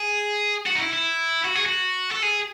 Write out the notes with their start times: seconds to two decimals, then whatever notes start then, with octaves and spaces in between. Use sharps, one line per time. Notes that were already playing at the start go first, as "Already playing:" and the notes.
Already playing: G#4
0.66 F#4
0.75 D#4
0.80 E4
0.93 E4
1.44 F#4
1.55 G#4
1.66 F#4
2.12 A4
2.23 G#4